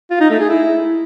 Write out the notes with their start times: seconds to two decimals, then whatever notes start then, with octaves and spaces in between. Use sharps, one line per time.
0.11 F4
0.20 D#4
0.30 A3
0.40 G#4
0.49 E4